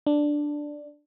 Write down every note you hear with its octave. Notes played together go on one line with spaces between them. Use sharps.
D4